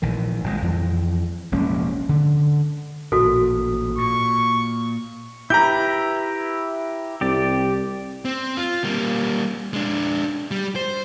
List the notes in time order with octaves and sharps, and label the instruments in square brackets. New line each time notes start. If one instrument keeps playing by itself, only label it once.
[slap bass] A#1 D#3 E3
G#1 A#2 D3 G#3
F2 E3
F1 A#1 G#3 C#4
D3
[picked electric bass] A1 A#2 [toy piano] F#4 A4
[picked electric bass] A#2 [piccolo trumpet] C#6
[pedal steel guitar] E4 G4 B4 [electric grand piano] A#5 G6
[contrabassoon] C2 [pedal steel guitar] G4 D5
[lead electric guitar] C4
F4
G3 A#3
G#3 D4
G3
C5